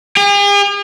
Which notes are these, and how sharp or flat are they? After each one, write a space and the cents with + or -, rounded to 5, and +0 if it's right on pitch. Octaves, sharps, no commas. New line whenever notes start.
G#4 -45